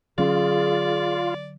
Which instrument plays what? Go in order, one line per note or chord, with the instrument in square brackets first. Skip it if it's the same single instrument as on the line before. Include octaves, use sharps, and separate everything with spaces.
[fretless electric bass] D3 F#3 C#4 [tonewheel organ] F4 [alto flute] G#4 [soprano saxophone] D5